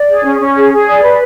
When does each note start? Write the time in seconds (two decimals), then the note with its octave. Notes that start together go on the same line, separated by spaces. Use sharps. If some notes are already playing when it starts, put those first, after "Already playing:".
Already playing: D5
0.09 G#4
0.24 C#4
0.40 C#4
0.56 G#4
0.72 G#4
0.87 D5
1.02 B4